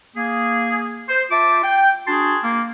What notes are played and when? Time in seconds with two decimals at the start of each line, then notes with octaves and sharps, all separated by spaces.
0.17 A#3 G#4
1.09 C5
1.31 F4 E5 A5 D6
1.64 G5
2.08 D4 F#4 G#4 A5 C6
2.44 A#3